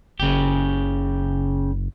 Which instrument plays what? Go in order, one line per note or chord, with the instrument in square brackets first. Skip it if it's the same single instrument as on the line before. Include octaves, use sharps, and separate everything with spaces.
[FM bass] F#1 [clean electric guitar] C#3 G4